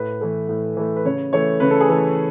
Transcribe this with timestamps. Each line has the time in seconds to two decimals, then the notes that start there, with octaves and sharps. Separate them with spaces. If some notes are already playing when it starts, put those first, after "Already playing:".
Already playing: A2 B4
0.21 E3 A3
0.49 A2
0.77 E3 A3
0.96 B4
1.05 C#3 C#5
1.33 E3 A3 C#5
1.60 C#3 B4
1.71 A4
1.80 G#4
1.89 E3 A3 A4